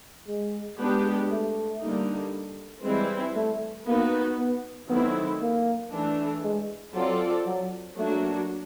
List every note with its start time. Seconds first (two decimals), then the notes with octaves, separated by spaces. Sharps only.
0.28 G#3
0.78 G#3 B3 D4 G4
1.30 A3
1.81 D3 G3 A#3 D#4
2.84 E3 G3 G#3 C4 E4
3.36 A3
3.86 A#3 B3 D#4 F#4 B4
4.38 B3
4.89 D#3 F#3 A3 B3 C4 E4
5.41 A#3
5.92 E3 A3 D4
6.43 G#3
6.95 F#3 C4 F4 A4 D5
7.46 F#3
7.97 F#3 A3 A#3 D4 F#4